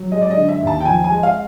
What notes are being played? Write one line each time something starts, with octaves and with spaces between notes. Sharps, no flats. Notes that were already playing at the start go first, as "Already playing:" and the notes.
Already playing: F#3
G#3 D#5
D5
D#5
D3
E5
D#2
A5
G5
F3 G#5
G#5
G#3
F5